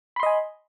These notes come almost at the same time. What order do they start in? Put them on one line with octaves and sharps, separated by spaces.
B5 C6 D#5 G#5